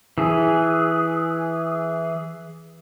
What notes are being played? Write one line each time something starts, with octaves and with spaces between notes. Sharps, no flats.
E3 G#4